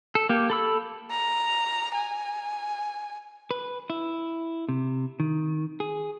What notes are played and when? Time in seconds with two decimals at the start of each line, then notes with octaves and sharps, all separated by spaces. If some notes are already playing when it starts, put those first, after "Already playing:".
0.15 A4
0.29 A#3 G4
0.50 A4 B5 E6
1.11 A#5
1.94 G#5
3.51 B4
3.90 E4
4.69 C3
5.20 D#3
5.80 G#4